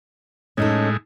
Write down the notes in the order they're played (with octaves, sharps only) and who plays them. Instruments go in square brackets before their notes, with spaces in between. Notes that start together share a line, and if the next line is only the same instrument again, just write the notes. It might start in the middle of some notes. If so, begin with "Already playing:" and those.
[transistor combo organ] A2 G#3 [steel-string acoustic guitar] C#4 D#4 A4